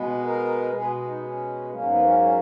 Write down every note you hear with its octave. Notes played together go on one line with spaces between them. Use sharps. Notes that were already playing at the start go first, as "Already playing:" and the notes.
Already playing: B2 G#3 B3
A#4
B2 G#3 B3 G#4
D#4
C#4
G#2 F#3 A#3 C#4
B3
C#4
C#4